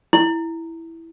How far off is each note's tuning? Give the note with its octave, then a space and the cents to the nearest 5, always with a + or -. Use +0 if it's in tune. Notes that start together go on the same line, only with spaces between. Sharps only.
E4 +0